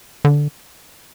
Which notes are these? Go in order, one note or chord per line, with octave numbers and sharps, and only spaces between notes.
D3